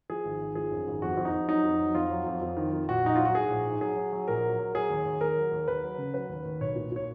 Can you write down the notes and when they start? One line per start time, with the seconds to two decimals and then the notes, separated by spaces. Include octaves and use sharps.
0.10 F3 G#4
0.25 G#1
0.40 G#1
0.55 F3 G#4
0.71 F#2
0.87 G#1
1.02 F2 F#4
1.17 F2
1.25 D#4
1.33 F2
1.48 F#3 D#4
1.64 F2
1.80 F#3
1.95 F2 F4
2.11 F#3
2.26 F2
2.41 F2
2.57 D#3
2.73 F2
2.89 A#1 F#4
3.04 A#1 D#4
3.16 F#3 F4
3.25 F#4
3.35 G#2 G#4
3.50 A#1
3.66 G#2
3.81 F#3 G#4
3.96 F#3
4.13 F#3
4.28 A#1 A#4
4.43 F#3
4.59 F#3
4.75 F#3 G#4
4.90 D#2
5.06 D#2
5.21 D#2 A#4
5.37 F#3
5.51 D#2
5.68 D#2 B4
5.84 F#3
5.98 C#3
6.14 F#3 B4
6.29 D#2
6.45 D#2
6.61 B1 C#5
6.76 A#2
6.92 A#2 C#5